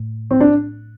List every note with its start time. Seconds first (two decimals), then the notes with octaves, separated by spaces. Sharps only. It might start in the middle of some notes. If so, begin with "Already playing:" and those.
Already playing: A2
0.31 C4
0.40 D4